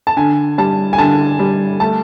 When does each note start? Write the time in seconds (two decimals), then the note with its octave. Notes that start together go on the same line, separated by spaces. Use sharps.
0.07 A5
0.17 D3 G#5
0.58 G3 A5
0.93 G#5
0.98 D3 A5
1.39 G3
1.80 A3 A5